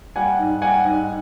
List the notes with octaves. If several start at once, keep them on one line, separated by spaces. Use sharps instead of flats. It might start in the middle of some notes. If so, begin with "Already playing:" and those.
G3 F#5 G#5
G#2
G3 F#5 G#5
G#2